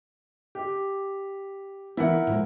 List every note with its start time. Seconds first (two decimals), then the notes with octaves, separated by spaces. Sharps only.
0.55 G4
1.97 E3 B3 E4 A#4 F#5
2.27 A2 F3 G#3